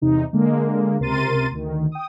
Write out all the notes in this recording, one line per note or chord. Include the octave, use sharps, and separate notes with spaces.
E2 C3 D#4
D3 G#3 A#3
C#2 C3 A#4 C6 A6 D#7
D2 D#3
G5 D#6